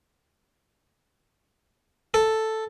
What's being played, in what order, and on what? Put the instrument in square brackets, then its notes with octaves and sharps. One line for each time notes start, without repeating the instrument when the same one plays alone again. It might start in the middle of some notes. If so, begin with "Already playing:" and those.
[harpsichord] A4